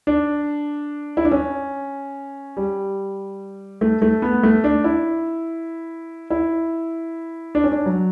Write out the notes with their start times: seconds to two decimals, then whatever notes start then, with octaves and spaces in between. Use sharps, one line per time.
0.07 D4
1.17 E4
1.25 D4
1.31 C#4
2.57 G3
3.81 A3
4.02 A3
4.22 B3
4.43 A3
4.64 D4
4.84 E4
6.30 E4
7.55 D4
7.64 C#4
7.72 D4
7.86 F#3